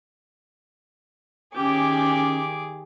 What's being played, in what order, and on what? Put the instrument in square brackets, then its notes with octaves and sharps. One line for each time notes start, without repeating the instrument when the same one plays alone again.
[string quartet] D#3 G#4 D6 [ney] C#4 [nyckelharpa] G4